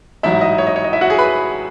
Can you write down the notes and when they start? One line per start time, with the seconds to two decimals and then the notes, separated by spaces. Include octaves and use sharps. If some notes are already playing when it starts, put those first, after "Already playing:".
0.23 A1 G#2 F#3 E4 E5
0.41 D#5
0.58 C#5
0.67 D#5
0.76 C#5
0.84 D#5
0.93 E4 E5
1.01 F#4 F#5
1.10 G#4 G#5
1.18 B4 B5